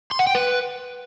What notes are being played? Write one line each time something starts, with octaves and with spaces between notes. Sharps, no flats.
C6
F#5
G5
B4